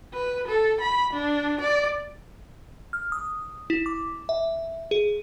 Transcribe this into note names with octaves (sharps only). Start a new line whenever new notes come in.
B4
A4
B5
D4
D5
F6
D#6
E4
D6
E5
G#4